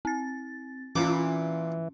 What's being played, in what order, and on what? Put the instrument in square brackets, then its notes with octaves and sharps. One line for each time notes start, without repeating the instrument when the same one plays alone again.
[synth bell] C4 A6
[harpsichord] A#2 D6 [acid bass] E3 [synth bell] C#4